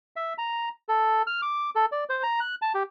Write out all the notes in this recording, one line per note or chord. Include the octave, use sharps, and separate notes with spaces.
E5
A#5
A4
F6
D6
A4
D5
C5
A#5
F#6
A5
G4